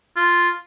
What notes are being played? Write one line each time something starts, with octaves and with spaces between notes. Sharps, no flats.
F4